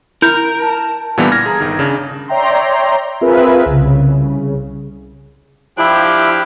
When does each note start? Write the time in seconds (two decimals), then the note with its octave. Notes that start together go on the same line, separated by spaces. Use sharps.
0.22 E4 A#4 G6
0.62 A5
1.17 A#2 D3 E3 G3 B3
1.32 F6 G#6 A#6
1.46 G#4 A#5
1.60 G1 D#3
1.79 C#3 D4
2.28 C#5 D5 E5 G5 A#5 C6
3.21 C4 F4 G#4 A#4 B4 E5
3.66 C2 C#3
5.78 F3 D4 E4 G4